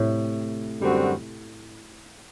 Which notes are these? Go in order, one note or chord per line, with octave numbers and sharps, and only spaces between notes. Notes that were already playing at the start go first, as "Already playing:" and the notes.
Already playing: A2 C3
F#2 D3 G3 C4 F#4